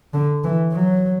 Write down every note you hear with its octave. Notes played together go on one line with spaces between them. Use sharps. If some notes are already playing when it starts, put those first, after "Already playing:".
D3
E3
F#3